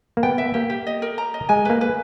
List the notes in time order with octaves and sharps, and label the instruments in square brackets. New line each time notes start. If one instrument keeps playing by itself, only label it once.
[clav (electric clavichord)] A#3
[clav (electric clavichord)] B3 [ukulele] G5
[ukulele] E5
[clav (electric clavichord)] A#3 [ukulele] G4
[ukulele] G4
D#5
A#4
A#5
D#5
[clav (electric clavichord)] G#3 [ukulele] G#5
[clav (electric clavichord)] A#3 [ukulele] B4
[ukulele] B4